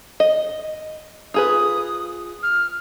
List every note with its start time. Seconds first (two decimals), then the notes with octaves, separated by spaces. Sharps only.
0.20 D#5
1.34 F4 G#4 B4 D#6
2.43 F6